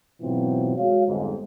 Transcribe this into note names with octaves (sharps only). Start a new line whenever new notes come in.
G#2 B2 E3 F#3 C4 F4
G#3 F#4 C#5 F5
G1 F2 G#2